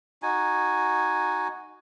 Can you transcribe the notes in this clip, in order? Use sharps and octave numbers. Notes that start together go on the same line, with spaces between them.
D#4 F#4 G#5